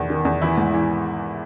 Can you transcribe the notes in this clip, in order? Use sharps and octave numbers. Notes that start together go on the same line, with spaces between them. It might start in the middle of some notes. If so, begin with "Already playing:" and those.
Already playing: E2 D#3
D#3
E2
E3 E4
G#2
E3